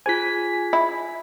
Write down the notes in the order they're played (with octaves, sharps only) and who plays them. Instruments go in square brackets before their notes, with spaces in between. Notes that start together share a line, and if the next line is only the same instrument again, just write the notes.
[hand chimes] F4 G#4 C5 [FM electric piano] G#5 B6
[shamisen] E4